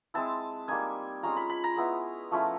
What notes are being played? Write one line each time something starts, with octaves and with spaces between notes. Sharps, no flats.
G#3 C4 E4 A5
G3 A#3 D#4 G#5
G#3 C#4 F4 A#5
B5
B5
A#5
G#3 B3 E4
F3 A3 C#4 E4